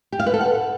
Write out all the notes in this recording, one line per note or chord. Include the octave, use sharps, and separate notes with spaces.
G4
F5
B4
A4
F#5